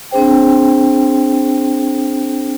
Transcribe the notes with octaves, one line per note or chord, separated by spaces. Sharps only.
C4 D4 G#4 C5 G5